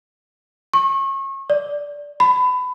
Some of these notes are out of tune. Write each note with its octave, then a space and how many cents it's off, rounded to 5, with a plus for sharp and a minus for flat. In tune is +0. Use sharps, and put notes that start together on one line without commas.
C#6 -35
D5 -10
B5 +25